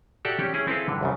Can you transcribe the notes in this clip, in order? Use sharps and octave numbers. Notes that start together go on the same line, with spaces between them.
F#4 G4 A4 D5 E5 F#5
C4 C#4 G4
C#4 E4 G#4
C4 E4 G#4 A4 B4 F5
G2 D3
C2 F#2 C#3